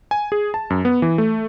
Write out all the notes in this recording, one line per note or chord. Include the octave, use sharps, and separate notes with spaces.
G#5
G#4
A5
F#2
B3
E3
A3